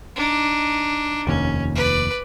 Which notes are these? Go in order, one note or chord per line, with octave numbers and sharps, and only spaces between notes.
D4 D#4
F1 D#2 C#4
B4 D5